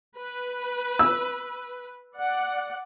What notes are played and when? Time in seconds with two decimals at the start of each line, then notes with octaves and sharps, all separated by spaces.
0.18 B4
0.99 E6
2.18 D5 F#5